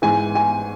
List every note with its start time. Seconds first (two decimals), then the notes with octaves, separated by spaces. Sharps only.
0.02 G#2 E3 G#5
0.35 G#5